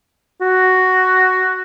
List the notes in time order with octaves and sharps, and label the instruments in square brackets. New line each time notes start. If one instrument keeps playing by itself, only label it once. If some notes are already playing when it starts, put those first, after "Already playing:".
[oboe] F#4